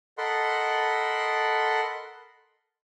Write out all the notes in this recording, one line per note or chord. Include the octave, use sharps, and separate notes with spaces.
A4 A#4 D#5 F#5 B5 C6